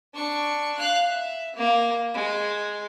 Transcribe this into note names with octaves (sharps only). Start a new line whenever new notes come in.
D4 C#6
F5 F#6
E5
A#3
G#3